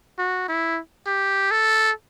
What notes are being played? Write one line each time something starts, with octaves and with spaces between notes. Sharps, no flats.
F#4
E4
G4
A4